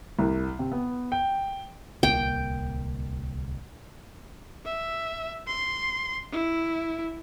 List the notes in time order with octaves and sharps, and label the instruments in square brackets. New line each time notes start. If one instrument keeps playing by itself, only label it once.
[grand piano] C2
C3
B3
G5
[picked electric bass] D1 C2 A#3 [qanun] G5
[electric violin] E5
C6
E4